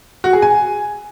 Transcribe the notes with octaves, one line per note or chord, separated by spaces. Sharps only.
F#4
G#4
G#5